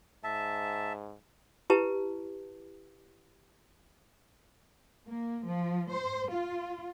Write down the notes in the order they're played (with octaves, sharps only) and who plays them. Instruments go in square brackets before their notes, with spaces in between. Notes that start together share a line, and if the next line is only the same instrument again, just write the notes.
[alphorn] G#2 [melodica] E5 A5
[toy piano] E4 G4 B4 A5
[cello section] A#3
F3
C5
F4